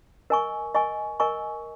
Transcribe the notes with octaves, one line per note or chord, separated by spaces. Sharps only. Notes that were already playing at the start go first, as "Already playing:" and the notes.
A#4 D#5 G#5 C#6
A#4 D#5 G#5 C#6
A#4 D#5 G#5 C#6